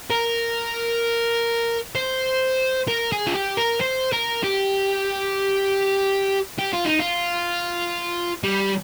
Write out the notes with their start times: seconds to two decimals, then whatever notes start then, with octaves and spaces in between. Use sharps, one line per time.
0.10 A#4
1.95 C5
2.88 A#4
3.12 G#4
3.27 F4
3.35 G4
3.58 A#4
3.81 C5
4.13 A#4
4.44 G4
6.59 G4
6.73 F4
6.85 D#4
6.99 F4
8.44 G3